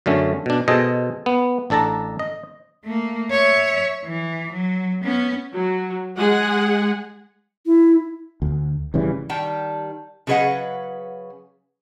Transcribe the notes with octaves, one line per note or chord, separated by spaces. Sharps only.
F#2 D3 A3 C#4
B2 D4
B2 G#4 A4 C5 D#5
B3
A1 D4 A4 A5 A#5
D#5
A3 A#3
C#5 E5
E3
F#3
B3 C#4
F#3
G#3 G#4 F#5
E4
D2
A1 C#3 E3 G3
D#3 G3 G5 A5
C#3 F#3 G#4 B4 D#5 F#5